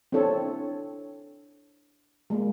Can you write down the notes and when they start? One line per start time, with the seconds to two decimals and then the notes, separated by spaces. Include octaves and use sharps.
0.12 C4 D4 E4 A4 C#5
2.30 G#3 A#3